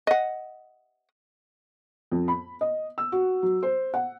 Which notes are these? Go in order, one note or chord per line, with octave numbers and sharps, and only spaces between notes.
D#5 F#5
F2
B5
D#5
E6
F#4
F#3
C5
F#5